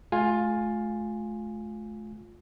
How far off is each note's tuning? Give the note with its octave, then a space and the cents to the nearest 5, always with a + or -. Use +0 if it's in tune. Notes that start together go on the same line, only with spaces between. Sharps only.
A3 -35 F4 +15 G#5 +0